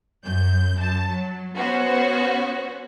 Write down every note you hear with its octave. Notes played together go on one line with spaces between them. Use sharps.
F#2 G6
F#2 A5
F#3
B3 C#4 F#4 C5